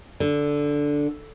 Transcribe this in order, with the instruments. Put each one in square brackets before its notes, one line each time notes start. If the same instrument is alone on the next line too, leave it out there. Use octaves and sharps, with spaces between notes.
[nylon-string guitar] D3